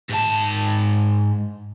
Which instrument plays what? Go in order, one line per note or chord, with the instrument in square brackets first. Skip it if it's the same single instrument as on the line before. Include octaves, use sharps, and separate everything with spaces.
[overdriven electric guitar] G#2 A5